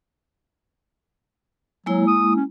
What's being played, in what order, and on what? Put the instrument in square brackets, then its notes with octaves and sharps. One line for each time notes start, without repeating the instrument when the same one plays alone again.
[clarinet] F#3 [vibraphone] G#3 A#3 E4
[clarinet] D#6
C#4